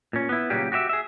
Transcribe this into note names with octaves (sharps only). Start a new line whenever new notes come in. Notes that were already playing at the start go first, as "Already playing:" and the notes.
A#2 C#4
B3 E4
A#2 C#3 F#3 G3 G4
F#4 G4 C5 E5
G#4 E5